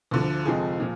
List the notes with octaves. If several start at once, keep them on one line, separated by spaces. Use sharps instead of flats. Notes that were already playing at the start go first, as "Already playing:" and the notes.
D2 D3 F3
F1 F2 F3 G#3 G#4
A#2 F3